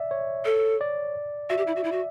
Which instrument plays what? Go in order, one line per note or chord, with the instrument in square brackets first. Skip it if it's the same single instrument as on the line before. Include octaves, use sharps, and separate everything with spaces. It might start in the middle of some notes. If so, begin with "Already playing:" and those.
Already playing: [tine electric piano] D5 E5
C#5
[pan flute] A4
[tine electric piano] D5
[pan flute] F#4 [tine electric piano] E5
[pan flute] G4
E4
F#4
E4
F#4